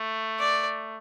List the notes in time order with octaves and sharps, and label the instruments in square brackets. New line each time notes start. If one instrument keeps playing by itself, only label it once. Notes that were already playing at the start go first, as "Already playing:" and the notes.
Already playing: [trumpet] A3
[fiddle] D5